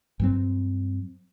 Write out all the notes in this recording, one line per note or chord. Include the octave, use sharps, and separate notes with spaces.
G2 F#3 C4